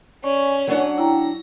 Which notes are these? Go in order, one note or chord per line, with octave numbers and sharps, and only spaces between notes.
C#4 D5 G#5 C#6
F#3 D4 F#5
E4 G5 A#5 A#6